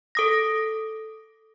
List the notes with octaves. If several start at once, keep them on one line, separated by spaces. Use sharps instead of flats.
A4 D#6 A#6